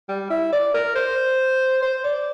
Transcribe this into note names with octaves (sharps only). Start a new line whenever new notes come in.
G3
E4
D5
A#4
C5
C5
D5